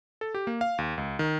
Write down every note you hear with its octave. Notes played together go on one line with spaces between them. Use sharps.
A4
G4
A#3
F5
D#2
C#2
D#3